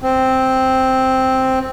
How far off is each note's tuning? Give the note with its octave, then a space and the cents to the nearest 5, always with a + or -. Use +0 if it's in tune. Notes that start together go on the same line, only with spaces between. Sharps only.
C4 +0